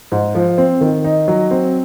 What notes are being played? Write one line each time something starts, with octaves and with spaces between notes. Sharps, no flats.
G#2
F3
C4
D#3
D#4
F#3
C4